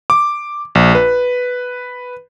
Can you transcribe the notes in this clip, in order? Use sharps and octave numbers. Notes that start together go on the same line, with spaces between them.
D6
A#1
B4